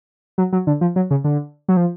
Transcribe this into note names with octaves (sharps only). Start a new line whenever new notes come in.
F#3
F#3
D3
F3
F#3
C#3
D3
F#3
F3